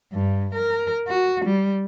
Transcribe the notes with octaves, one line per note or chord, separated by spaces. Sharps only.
G2
A#4
F#4
G3